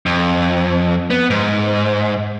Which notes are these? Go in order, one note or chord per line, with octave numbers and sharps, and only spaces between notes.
F2
B3
G#2